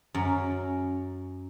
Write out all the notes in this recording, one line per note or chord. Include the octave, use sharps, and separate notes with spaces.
F#2